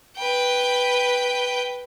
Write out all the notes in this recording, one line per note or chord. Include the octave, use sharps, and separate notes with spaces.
B4 G5